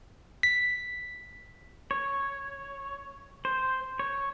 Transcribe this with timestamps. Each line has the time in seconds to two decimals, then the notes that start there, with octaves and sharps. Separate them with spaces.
0.43 B6
1.91 C#5
3.45 C5
3.99 C#5